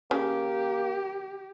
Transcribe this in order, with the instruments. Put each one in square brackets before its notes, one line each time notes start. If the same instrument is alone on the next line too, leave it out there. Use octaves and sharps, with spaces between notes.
[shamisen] C#3 [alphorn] A#3 [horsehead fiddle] G4